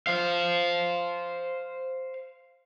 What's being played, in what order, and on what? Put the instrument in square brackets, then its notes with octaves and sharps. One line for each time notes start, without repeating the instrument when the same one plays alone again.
[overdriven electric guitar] C5 F5